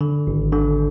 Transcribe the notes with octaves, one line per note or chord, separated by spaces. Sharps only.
D3
G#1
D3